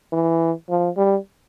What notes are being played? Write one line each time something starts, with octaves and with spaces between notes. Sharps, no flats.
E3
F3
G3